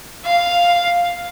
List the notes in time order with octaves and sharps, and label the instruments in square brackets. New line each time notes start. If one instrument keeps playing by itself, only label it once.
[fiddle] F5